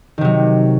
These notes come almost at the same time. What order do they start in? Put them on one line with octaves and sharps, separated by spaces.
D#3 C3 F#3